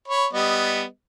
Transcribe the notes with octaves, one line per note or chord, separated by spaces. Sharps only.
C#5 B5
G3 B3 D#5